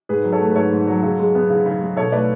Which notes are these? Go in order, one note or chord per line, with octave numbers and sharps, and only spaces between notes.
G#2 G#4 B4
F#3
A4 C#5
A3
B4
G#2 A4 C#5
G#2
F#3
C#3
G#3
B3
C#3
C#3
G#3
B2 A4 C#5
A3 B4 D5